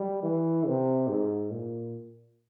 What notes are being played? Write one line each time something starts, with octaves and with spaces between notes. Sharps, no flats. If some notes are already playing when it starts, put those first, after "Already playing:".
Already playing: G3
E3
C3
G#2
A#2